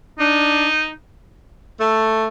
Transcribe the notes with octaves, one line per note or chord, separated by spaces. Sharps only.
D4 D#4
A3